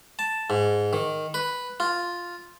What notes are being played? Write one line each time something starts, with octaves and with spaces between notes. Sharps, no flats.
A5
G#2
D#3
B4
F4